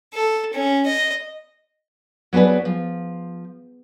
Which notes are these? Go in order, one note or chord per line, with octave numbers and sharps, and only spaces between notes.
A4
C#4
D#5
F#3 B3 D4 G#4 B4
F3